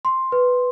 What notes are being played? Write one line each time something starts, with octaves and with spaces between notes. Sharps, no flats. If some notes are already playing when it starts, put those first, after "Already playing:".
C6
B4